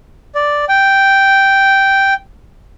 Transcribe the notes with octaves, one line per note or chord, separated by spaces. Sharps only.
D5
G5